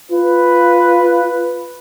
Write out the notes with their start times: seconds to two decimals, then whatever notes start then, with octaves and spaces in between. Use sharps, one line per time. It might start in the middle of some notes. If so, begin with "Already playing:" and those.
0.11 F4 B4